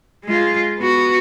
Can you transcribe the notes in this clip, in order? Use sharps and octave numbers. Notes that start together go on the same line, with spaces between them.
G#3 F4
B3 F#4